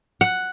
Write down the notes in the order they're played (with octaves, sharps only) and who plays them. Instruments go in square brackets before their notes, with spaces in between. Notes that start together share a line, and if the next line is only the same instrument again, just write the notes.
[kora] F#5